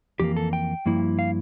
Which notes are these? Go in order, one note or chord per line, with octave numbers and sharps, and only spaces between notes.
F2 E3 A#3 G4
A4
G5
G2 F3 A#3 E4
F5